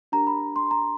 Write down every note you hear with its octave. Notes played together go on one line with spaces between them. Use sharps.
D4 G4 A#4 A#5
B5
B5
C6
A#5